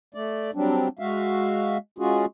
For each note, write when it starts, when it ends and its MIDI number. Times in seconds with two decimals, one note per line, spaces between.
0.14 0.51 57
0.14 0.51 74
0.54 0.88 54
0.54 0.88 55
0.54 0.88 60
0.54 0.88 62
0.99 1.78 56
0.99 1.78 66
0.99 1.78 76
0.99 1.78 77
1.98 2.26 56
1.98 2.26 61
1.98 2.26 65
1.98 2.26 66
1.98 2.26 68